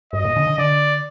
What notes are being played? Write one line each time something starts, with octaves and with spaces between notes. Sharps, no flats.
G2 D#5
A#2
D3
D3
D3 D5